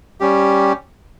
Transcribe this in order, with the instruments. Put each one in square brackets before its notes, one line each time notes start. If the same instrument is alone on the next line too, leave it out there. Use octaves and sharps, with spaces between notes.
[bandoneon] G3 C#4 G4